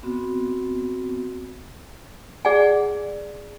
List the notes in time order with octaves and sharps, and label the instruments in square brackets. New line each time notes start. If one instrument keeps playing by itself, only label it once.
[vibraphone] B3 C4 F#4
[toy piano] G#4 D5 F#5 G#5